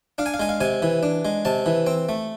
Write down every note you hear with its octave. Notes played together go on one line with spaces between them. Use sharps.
D4 F5
G#5
F5
G#3 G#5
F5
C3 G#5
E3
D4
G#3
C3 A5
E3
C4
A3